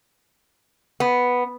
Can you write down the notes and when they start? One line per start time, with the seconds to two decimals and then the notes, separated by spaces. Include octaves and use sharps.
1.00 B3